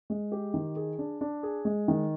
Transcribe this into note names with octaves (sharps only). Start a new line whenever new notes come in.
G#3
G4
D#3
G#4
D4
D4
G#4
G#3
D#3